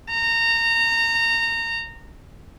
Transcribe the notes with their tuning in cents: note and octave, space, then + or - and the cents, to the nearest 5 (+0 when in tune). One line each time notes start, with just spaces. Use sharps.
A#5 -20